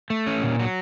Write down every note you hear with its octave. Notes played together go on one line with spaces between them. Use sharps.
A3
C#4
A#2
F#3